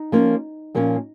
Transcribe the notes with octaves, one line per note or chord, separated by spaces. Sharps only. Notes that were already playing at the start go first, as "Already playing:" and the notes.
Already playing: D#4
F3 A#3 C#4
A#2 F3 A#3 C#4